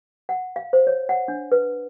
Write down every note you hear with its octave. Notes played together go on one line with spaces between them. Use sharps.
F#5
F5
C5
C#5
F#5
D4
B4